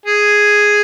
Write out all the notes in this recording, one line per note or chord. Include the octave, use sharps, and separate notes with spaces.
G#4